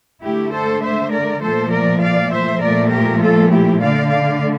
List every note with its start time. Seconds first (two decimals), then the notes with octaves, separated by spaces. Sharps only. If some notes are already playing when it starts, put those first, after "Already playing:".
0.23 D3 A3 E4 G4
0.52 A4 C5
0.82 C5 E5
1.12 A#4 D5
1.41 A#2 F3 A3 A4 C5
1.71 A#4 D5
2.01 D5 F5
2.31 C5 E5
2.61 A#2 F3 A3 A#4 D5
2.91 G4 A#4
3.20 F4 A4
3.51 E4 G4
3.80 D3 A3 D5 F5
4.10 D5 F5